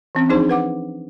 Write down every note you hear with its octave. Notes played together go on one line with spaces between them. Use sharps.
E3 C4 C#4
F3 D4 D#4 G#4 C5
B4 F#5 D6